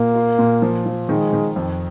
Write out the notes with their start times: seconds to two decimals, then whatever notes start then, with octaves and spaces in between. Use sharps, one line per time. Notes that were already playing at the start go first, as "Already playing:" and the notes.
Already playing: A#2 A#3
0.15 F4
0.38 A#2
0.62 F3
0.86 F3
1.09 D#3 G#3
1.33 D#3
1.56 F2